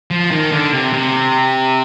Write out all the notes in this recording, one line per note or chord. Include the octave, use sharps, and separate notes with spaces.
F3
D#3
D3
C3
C3